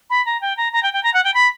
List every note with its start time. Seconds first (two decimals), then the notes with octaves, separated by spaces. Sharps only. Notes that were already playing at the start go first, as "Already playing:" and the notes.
0.10 B5
0.26 A#5
0.41 G5
0.57 A#5
0.73 A#5
0.83 G5
0.93 G5
1.04 A#5
1.14 F#5
1.24 G5
1.34 B5